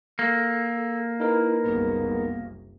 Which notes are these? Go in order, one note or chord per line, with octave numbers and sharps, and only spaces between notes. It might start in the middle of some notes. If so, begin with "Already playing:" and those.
A#3 A4
D#4 E4 A#4 B4
F#1 C2 B3